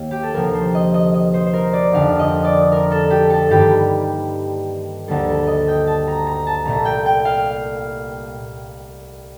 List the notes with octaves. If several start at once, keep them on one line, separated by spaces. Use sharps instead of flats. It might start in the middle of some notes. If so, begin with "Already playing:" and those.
Already playing: D#2 D#3 A#3
G4
A4
D2 C3 F3 A#3 A#4
C5
D#5
D#5
D#5
C5
C5
A#4
D5
F1 F2 D3 F5
D#5
D5
A#4
A4
G4
A4
G2 D#3 G3 A#3 G4
D2 D3 G3 A#3 A4
A4
D#5
G5
A5
A#5
A#5
A5
C2 A#2 A3 A#5
G5
G5
F5